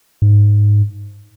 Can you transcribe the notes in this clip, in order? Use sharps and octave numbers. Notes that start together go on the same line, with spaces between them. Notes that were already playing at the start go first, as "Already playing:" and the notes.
G#2